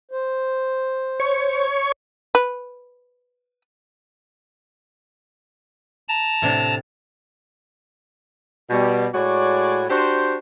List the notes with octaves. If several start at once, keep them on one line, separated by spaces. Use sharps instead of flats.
C5
C#5 C#6
B4
A5 A#5
A2 C3 D4
B2 G3
A2 G#3 F#4 C#5 D5
D4 F#4 G4 C5